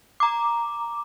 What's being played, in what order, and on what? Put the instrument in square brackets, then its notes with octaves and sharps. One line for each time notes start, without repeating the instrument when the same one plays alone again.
[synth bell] A#5 D6